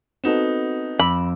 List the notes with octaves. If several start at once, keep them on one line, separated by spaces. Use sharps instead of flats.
B3 C4 D#4 F#4 A4 E7
F2 B5 D6 E6